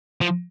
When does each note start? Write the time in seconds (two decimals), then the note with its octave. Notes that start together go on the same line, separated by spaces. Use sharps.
0.21 F3